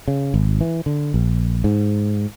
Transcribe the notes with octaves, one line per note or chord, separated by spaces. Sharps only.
C#3
G#1
E3
D3
A#1
G#2